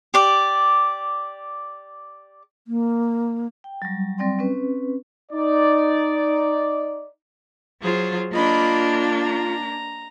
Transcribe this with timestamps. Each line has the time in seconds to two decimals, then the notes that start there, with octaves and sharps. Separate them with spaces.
0.14 G4 D5 D6
2.68 A#3
3.64 G5
3.82 F#3 G3
4.18 F#3 G3 C4 D5 G5 C6
4.39 C4 C#4 B4
5.32 D#4 D5
7.81 F#3 F4 G#4 C5
8.33 A#3 D4 F4 D#5 B5
9.24 A#5